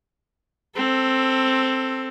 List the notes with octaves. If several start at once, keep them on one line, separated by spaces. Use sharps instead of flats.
C4 A4